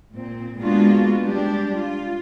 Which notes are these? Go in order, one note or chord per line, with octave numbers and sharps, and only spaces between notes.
A#2 C4
G#3 A#3 B3 D4 F4 F#4
G3 G#3 D4 G4
F4